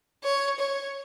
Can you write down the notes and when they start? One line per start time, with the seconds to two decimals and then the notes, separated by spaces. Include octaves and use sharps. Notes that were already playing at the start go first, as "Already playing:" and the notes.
0.23 C#5
0.60 C#5